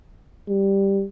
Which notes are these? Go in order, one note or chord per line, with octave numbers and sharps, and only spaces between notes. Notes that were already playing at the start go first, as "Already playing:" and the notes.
G3